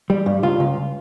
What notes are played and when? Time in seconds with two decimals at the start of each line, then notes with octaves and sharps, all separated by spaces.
0.10 G3
0.26 G2
0.43 C#2 F4
0.60 C#2